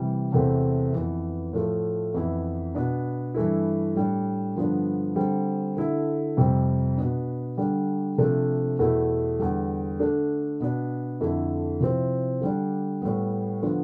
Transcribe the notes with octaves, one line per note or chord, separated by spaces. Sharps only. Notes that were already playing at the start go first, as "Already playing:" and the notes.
Already playing: C3 E3 G3
E2 C3 E3 A3 C4
F2 E3 B3
A2 F3 A3
F2 E3 B3 E4
B2 B3 D4
G2 E3 A3 E4
A2 G3 D4
G2 D3 F3 B3 D4
D3 G3 C4
D3 A3 E4
F2 C3 G3 C4
B2 B3 D4
D3 G3 D4
C3 F3 A3 D4
E2 B2 A3 E4
E2 D3 G3
D3 A3 D4
B2 B3 D4
F2 D3 A3 E4
C3 F3 C4 E4
D3 G3 D4
A2 G3 B3
D3 F3 B3 D4